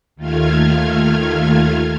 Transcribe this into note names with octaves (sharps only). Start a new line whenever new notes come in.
D#2 D#3 A3 F4 F6 G#6